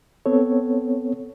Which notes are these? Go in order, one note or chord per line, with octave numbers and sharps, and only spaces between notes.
B3 C4 A4 C#5